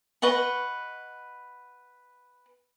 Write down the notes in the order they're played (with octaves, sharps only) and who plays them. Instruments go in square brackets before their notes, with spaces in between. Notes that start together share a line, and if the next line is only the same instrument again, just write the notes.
[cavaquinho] B4 D#5 F#5 C#6